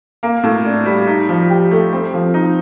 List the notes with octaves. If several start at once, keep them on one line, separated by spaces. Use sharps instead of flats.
A#3
A2
D4
G3
D#4
F3
G4
A3
C4
F3
D#4